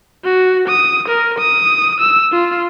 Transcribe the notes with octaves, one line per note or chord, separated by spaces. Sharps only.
F#4
D#6
A#4
D#6
E6
F4